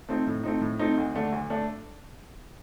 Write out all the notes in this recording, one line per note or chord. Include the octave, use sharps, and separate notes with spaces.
A3 C4 D#4
A2
A3 C4 D#4
A2
A3 C4 D#4
D2
D3 A3 D4
D2
A3 D4